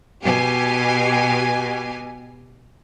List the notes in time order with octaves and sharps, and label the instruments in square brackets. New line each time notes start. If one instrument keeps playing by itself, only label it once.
[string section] B2 G4 G#5